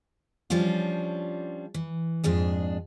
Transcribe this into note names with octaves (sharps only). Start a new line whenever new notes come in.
F3 G3 C#4 D4 F4
E3
F2 G#2 D4 G#4